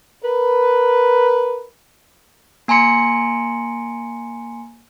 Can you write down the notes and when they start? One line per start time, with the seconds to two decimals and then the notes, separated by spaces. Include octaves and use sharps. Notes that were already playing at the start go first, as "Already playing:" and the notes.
0.24 A#4 B4
2.68 A#3 G#5 A#5 C6 C#7